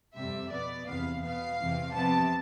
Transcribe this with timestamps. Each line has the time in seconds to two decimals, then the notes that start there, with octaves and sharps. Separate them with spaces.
0.17 F2 C3 G3 E5
0.52 B2 B3 D5
0.88 E2 C3 E3 B3 F5
1.24 B2 B3 F5
1.59 E2 C3 E3
1.94 C3 F3 B3 A5